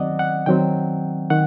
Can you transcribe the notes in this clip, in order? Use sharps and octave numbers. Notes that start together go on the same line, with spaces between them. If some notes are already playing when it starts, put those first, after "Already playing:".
Already playing: D#3 F#3 C4 D5 D#5 F#5
F#5
D#3 F#3 C4 G5
D#3 F#5